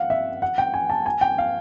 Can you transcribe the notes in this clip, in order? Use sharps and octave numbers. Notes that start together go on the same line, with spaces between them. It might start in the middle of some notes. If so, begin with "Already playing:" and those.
Already playing: F5 F#5
E5
F#5
G5
G#5
A5
G#5
G5
F5